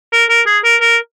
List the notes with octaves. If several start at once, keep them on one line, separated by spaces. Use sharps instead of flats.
A#4
A#4
G#4
A#4
A#4